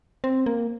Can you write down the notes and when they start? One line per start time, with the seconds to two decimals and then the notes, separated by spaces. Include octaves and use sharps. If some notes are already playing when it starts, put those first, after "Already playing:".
0.24 C4
0.46 A#3